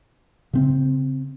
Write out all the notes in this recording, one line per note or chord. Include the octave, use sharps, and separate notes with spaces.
C#3 C4